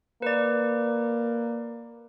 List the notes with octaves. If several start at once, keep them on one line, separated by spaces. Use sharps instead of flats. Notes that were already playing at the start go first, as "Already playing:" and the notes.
A#3 B4 D5